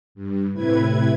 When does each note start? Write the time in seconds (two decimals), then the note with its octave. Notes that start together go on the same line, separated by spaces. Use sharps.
0.15 G2
0.53 A2 C3 E4 B4 G#6